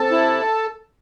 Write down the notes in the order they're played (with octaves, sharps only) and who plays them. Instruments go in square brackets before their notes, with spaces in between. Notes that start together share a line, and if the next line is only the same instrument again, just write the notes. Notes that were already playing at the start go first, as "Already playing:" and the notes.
Already playing: [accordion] C3 A4 A5
E4